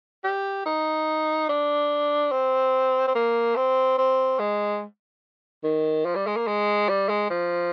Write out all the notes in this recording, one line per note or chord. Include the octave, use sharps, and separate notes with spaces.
G4
D#4
D4
C4
C4
A#3
C4
C4
G#3
D#3
F3
G3
G#3
A#3
G#3
G3
G#3
F3